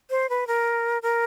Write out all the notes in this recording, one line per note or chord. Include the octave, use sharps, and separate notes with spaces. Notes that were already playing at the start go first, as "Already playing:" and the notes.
C5
B4
A#4
A#4